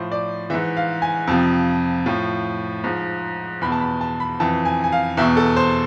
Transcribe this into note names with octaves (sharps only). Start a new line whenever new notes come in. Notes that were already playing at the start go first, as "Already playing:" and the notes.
Already playing: A2 F3 C5
D5
G#2 E3 E5
F5
G#5
F2 C3 F3 A5
A2 F3
G#2 F3
E2 B2 B5
A5
B5
A5
B5
F2 E3 A5
G#5
G#5
F5
E2 B2 E5
A4
C5